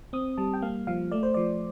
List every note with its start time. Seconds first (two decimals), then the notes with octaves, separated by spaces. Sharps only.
0.13 C4 D#6
0.38 G3 A5
0.54 G5
0.62 A#3 F5
0.87 F3 F5
1.11 A3 D5
1.23 C5
1.34 F3 D5